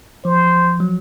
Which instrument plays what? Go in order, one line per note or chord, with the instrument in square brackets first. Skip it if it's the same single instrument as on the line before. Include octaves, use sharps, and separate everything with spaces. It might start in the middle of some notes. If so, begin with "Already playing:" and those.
[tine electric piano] F3 [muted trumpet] C5
[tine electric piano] F#3